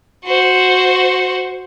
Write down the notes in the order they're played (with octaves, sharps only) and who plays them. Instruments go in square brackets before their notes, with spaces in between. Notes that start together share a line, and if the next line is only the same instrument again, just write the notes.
[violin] F#4 C5